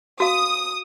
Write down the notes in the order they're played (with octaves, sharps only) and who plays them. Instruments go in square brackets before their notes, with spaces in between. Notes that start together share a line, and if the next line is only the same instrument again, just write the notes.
[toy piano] F#4 F5 [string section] D#6